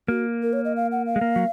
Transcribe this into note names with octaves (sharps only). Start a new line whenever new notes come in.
A#3 F#4
A#4
C#5
D#5
F5
F#5
F5
G#3
A#3
F#3